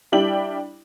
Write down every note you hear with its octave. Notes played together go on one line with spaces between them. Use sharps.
G3 D4 E4 G5 F#7